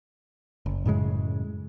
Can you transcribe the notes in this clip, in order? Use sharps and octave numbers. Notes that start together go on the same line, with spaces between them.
F#1
F#2 A2 C#3 G#3